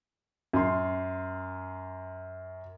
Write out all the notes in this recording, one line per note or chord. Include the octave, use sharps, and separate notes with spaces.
F#2 C6